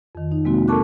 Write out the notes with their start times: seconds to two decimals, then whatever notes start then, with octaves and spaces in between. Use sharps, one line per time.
0.15 F2 D#3
0.32 D#4
0.45 C3 G#3 A#3 C4 F#4
0.68 A4 A#4 A5 C#6 D6 F#6